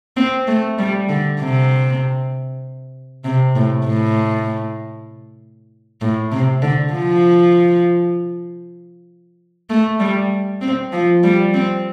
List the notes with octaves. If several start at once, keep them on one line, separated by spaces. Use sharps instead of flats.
C4
A3
G3
D3
C3
C3
A2
A2
A2
C3
D3
F3
A3
G3
C4
F3
G3
C4